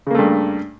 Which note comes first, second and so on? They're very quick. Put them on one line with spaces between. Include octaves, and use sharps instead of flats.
C#3 A#3 A3 G2